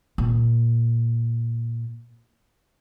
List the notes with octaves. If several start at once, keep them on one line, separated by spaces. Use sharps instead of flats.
A#2